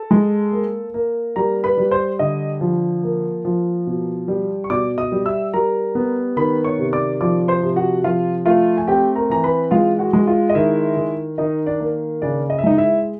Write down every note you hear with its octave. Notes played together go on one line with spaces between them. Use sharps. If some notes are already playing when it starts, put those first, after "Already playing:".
Already playing: A4 A5
G#3
A#3
A#3
G3 A#4 A#5
B4 B5
G3
C5 C6
D3 D#5 D#6
F3
A#3
F3
B2
G3
C#6
B2 D5 D6
D#5 D#6
G3
E5 E6
G3 A#4 A#5
B3
D#3 B4 B5
C#5 C#6
C3
D5 D6
F3 D5 D6
C5 C6
C3
F#4 F#5
F3 F4 F5
A3 F4 F5
G#5
C4 G4 G5
A#4 A#5
E3 A#5
B4 B5
G#3 F4 F5
F#4 F#5
G#3
F4 F5
D#5
D#3 E4 E5
D#3
D#3 D#4 D#5
D4 D5
A#3
C#3 D4 D5
D#5
E5
G#3 D#4 D#5
E4 E5